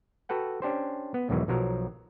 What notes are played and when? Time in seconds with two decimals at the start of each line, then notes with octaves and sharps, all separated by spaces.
0.29 F#4 A4 B4 F#5 G5
0.62 C#4 D4 G4 C5
1.14 B3
1.29 B1 E2 G#2 D#3 E3 F#3
1.48 B1 F3 F#3 A#4